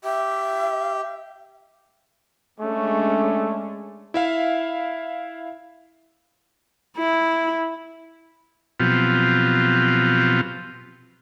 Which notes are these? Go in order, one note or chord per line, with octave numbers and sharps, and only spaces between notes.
G4 E5
G#3 A3 C#4 D4
E4 E5 F5
E4
B2 F3 F#3 C4 F4 G4